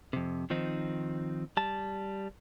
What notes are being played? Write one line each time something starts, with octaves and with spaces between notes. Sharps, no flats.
F2 C3
D#3 F3 C4 D#4
G3 A5